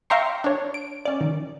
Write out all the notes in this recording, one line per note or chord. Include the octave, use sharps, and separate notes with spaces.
E5 F5 G5 A#5 C6 C#6
D4 C#5
D7
C#4 D5
D#3